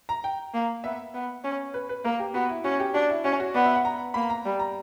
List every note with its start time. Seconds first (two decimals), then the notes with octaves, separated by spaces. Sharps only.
0.09 A#5
0.24 G5
0.54 A#3
0.84 B3 E5
1.14 B3
1.44 C#4
1.74 B4
1.89 B4
2.05 A#3 A#4
2.19 G4
2.34 B3 F#4
2.49 E4
2.64 C#4 F#4
2.80 G4
2.94 D4 F#4
3.10 E4
3.24 C#4 F#4
3.40 F#4
3.55 B3 D5
3.64 E5
3.75 F#5
3.85 A#5
4.14 A#3 B5
4.30 A#5
4.45 G3
4.59 A#5